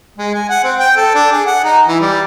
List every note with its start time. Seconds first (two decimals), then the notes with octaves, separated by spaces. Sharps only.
0.18 G#3
0.34 G#5
0.50 F#5
0.64 C4
0.79 G5
0.97 A4
1.15 D4
1.32 G#4
1.46 F#5
1.64 D#4
1.87 E3
2.01 G3